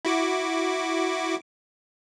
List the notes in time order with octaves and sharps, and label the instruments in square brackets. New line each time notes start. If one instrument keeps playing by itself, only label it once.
[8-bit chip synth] E4 F#4 D6